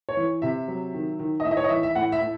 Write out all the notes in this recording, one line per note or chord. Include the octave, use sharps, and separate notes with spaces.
C#5
E3
C3 E5
F#3
D#3
D#3
D#5
A2 E5
D#5
C#5
D#5
E3 E5
E5
A2 F#5
E5
A2